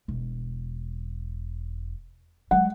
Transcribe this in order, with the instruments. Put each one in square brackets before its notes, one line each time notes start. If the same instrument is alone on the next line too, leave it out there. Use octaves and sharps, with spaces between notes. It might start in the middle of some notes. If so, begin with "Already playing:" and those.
[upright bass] E1
[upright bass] F#3 G#3 [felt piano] F#5